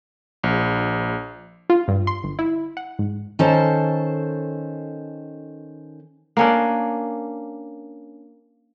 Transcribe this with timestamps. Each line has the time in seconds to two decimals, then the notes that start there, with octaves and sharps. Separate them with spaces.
0.44 A#1
1.70 F4
1.88 G2
2.07 C6
2.24 G1
2.39 E4
2.77 F#5
2.99 G#2
3.39 D#3 C#4 A4 C5 A5
6.37 A#3 C#4 D4